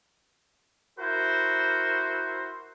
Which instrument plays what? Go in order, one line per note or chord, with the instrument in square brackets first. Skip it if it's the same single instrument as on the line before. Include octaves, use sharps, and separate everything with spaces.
[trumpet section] E4 F#4 A#4 C5